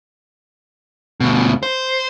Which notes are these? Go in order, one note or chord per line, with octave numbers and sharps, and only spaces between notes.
D2 B2
C5